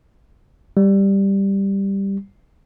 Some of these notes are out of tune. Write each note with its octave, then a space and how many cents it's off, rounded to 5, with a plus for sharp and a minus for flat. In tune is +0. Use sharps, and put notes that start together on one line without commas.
G3 +5